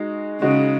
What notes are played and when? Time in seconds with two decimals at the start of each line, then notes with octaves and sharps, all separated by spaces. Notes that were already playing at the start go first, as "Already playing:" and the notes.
Already playing: G#3 D#4 F#4
0.42 C#3 G#3 D#4 F#4